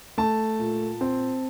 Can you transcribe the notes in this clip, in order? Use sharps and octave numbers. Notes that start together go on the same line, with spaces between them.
A3 A5
A#2
C4